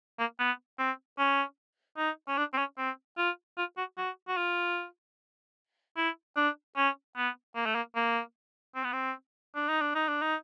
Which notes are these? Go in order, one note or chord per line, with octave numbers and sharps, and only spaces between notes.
A#3
B3
C4
C#4
D#4
C#4
D4
C4
C#4
C4
F4
F4
F#4
F#4
F#4
F4
E4
D4
C#4
B3
A#3
A3
A#3
A#3
C4
B3
C4
D4
D#4
D4
D#4
D4
D#4